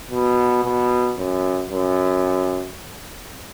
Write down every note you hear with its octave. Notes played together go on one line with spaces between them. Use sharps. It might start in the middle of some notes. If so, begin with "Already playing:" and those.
B2
B2
F#2
F#2